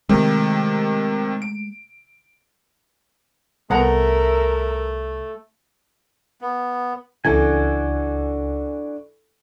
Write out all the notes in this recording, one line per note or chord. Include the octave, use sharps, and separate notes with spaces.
C3 D#3 G#3 A3
D7
C2 A3 B3 A#4 E5 F#5 A#5
B3
C#2 C#3 E3 D4 F#4 A4 G#5